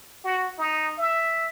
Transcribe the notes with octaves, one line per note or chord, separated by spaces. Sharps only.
F#4
D#4
E5